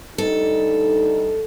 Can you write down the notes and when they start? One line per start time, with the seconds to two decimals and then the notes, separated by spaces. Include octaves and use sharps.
0.18 D2 G3 D#4 A4